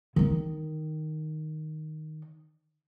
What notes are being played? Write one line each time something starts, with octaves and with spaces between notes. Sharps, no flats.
D#3 D#4